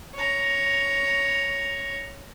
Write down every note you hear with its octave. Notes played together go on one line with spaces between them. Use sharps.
C#5 A#5